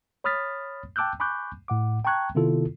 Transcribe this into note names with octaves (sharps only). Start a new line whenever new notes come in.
C#5 B5 D#6 F6 A6 B6
G5 A5 D6 E6 F#6 G6
G#5 B5 C#6 D6 F#6 G6
A2 F#5 D6
G5 A5 A#5 C#6 F#6 G#6
C3 D#3 B3 E4 F4 A4